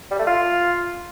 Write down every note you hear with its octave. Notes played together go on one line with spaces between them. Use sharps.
G3
A3
F4